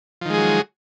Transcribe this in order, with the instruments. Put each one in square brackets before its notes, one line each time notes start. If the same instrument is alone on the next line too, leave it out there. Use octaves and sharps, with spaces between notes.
[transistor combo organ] F3
D#3
G#3
G#4
F#3